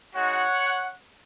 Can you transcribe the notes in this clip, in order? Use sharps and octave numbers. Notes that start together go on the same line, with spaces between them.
G#3 D#4 F#4 C#5 F#5